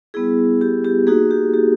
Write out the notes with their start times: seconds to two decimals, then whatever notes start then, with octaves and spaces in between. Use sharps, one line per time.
0.14 G3 B3 E4 G#4
0.61 G4
0.84 G4
1.07 A#3 D#4 F#4 G#4
1.31 G4
1.54 G4